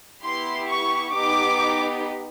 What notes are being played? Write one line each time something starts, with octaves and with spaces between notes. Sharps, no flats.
B3 E4 G4 C6
C#6
B3 D#4 G4 D6